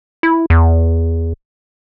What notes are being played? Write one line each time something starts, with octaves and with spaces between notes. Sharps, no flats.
E4
E2